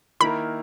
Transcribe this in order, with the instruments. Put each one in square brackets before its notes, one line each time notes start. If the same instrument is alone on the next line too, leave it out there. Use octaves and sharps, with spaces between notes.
[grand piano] D#3 A#3 E4 A#4 [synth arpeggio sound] B5